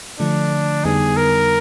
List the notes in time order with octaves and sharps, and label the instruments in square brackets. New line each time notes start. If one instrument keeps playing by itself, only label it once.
[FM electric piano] D3 F3 A3 [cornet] D4
[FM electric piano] F2 D3 G3 B3 D#4 [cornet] G#4
[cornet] A#4